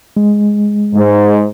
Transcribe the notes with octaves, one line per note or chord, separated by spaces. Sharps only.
G#3
G#2